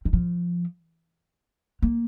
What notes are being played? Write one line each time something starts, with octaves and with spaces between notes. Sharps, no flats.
D#3
F3
A#3